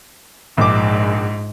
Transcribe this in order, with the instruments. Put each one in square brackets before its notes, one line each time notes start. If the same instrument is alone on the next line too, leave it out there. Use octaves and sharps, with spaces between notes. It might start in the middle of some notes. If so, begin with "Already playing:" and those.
[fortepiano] A#1 D6 [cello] G#2